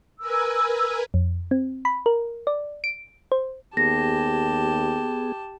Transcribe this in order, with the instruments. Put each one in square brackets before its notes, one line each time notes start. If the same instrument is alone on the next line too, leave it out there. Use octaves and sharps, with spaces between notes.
[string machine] A#4 B4 G#5 [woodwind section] E6
[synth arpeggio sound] F2
C4
B5
A#4
D5
D7
C5
[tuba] D#2 [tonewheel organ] B3 G#4 [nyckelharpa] G4 A5 [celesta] A#6